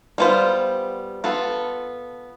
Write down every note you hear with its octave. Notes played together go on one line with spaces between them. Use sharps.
G3 B3 F4 C5
B3 F4 A4